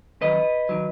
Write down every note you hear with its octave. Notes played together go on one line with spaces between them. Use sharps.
F2 D#3 F#3 B4 D#5
D#3 F#3